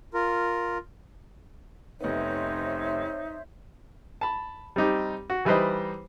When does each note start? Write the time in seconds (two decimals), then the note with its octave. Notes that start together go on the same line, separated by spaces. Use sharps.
0.14 F4 A#4
2.01 F1 B3 D#4 C5 C#5 E5
4.21 A5 B5
4.76 G3 C4 D#4 G4
5.30 F#4
5.45 E3 G3 D#4 B4 C5 D#5